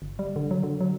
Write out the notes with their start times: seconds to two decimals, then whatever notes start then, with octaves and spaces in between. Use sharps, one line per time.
0.02 G1
0.19 G3
0.36 D3
0.51 F#3
0.63 D3
0.81 F#3